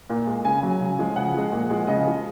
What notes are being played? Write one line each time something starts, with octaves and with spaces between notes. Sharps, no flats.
A#2
G#3
C#3 G#5
F#3
C#3
F3 G#3
C#3 F#5
F3 G#3
A#2
F3 G#3
C#3 D#5
F3 G#3